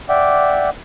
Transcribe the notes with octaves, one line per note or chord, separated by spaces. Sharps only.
D5 E5 F#5 G5 D6